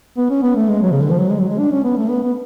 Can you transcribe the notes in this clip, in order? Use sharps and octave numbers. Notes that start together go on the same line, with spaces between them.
B3
C#4
B3
A3
G#3
F#3
C#3
D3
F3
F#3
G#3
F#3
G#3
D4
C#4
B3
A3
B3
B3